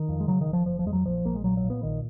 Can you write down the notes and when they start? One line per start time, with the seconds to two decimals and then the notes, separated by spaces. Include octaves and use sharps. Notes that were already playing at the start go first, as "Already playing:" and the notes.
Already playing: D#3
0.09 F2
0.20 G#3
0.28 C#3 F#3
0.41 D#3
0.47 F#1
0.53 F3
0.66 F#1 F3
0.79 F3
0.86 F2 G#3
0.93 F#3
1.06 A#1 F3
1.25 A#1 A#3
1.35 G#3
1.44 A#2 F#3
1.57 F#3
1.64 A#2
1.70 B3
1.83 A#1 D#3